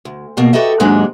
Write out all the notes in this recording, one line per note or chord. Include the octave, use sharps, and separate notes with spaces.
D2
E2 B2 A#3
F#4 G4 A4 B4 D#5 E5
D#2 G#2 F#3 G#3 D4 D#4